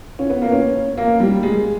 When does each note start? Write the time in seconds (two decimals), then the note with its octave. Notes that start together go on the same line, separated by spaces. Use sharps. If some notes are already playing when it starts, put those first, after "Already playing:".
0.19 C#4
0.30 B3
0.42 A#3
0.52 C#4
0.97 A#3
1.20 G3
1.43 G#3